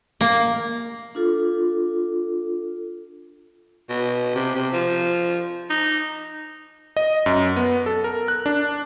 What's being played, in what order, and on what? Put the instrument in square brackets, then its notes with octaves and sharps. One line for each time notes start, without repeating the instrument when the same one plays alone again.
[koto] A#3
[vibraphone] D4 F4 A4
[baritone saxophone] B2
C3
C3
F3
D#4
[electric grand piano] D#5
F#2
B3
A4
A#4
F#6
D4